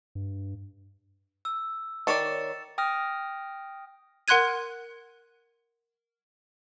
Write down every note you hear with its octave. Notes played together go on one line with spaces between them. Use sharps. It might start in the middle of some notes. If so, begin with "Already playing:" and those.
G2
E6
D#3 C#5 D5 A6 C#7 E7
G5 D#6 F6 A#6
A#4 F#5 C6 F#6 G#6 D#7